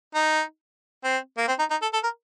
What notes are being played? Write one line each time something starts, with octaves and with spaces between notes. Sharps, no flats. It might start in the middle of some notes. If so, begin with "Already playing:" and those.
D#4
C4
A#3
C4
D#4
D#4
A4
A4
A#4